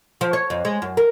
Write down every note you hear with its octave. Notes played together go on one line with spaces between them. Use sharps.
F3
C#5
F2
G#3
F#2
A#4